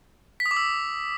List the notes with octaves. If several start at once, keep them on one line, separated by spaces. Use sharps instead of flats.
B6
D#6
D6
E6